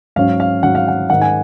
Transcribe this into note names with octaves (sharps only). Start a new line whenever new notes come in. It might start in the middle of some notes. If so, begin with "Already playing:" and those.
G#2 F#3 C#4 F5
F5
G#2 F#3 C#4 F#5
F5
F#5
G#2 D#3 G#3 D#4 F#5
G#5